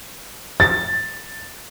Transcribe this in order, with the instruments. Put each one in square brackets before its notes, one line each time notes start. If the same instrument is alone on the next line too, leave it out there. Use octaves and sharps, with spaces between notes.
[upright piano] A6